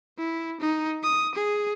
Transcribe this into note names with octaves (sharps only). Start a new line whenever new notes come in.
E4
D#4
D#6
G#4